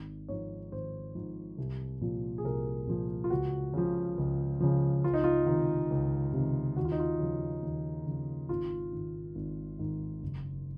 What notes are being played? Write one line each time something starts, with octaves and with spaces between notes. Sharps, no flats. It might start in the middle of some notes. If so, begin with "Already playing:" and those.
Already playing: G#1
G#2 F3 C#5
G#1 C5
G#2 F3
C2
A#2 F3
G#4
C2 A#4
A#2 F3
F4
C#2 F#4
C#3 F3
C#2
C#3 F3
C#2 F4
D#4
F4
C3 D#3
C#2
C3
D#3
D#2 F#4
F4
D#4
F4
C#3 F3
D#2
C#3 F3
G#1 F4
G#2 D#3
G#1
G#2 D#3
F#1